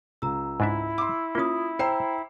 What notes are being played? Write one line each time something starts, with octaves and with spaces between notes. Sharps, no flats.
C#2 A#5 E6
G#2 D4 E4 E5
C6 D6 E6
A#3 C#4 F4 D#6
C5 G5 A#5 E6 C7